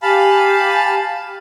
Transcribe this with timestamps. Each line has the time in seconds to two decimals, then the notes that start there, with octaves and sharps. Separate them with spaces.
0.02 G4 F5 G#5 A5 B5